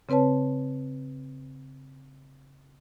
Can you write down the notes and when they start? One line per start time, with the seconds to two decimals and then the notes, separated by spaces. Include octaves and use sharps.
0.09 C#3 C4 B4 C#5 A5